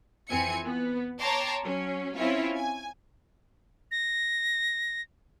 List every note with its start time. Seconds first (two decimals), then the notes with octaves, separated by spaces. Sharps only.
0.29 F2 E3 C4 G#5 C#7
0.64 B3
1.20 C#5 G5 A5 A#5 C6 D6
1.64 F#3 C#4
2.15 C4 C#4 E4 F4 C#5
2.57 G#5
3.91 A#6